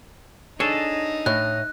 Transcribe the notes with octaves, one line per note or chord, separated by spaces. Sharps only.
D4 D#4 G#4 A4 C#5 D#5
A2 F#6